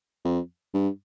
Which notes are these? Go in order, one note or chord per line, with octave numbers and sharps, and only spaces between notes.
F2
G2